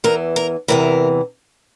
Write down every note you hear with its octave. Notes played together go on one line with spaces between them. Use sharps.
E2 E3 A#4
A#4
E2 C3 E3 A#4